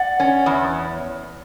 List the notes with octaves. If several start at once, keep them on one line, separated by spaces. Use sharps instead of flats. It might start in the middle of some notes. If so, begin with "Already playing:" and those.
Already playing: D5 F#5
C#4
E2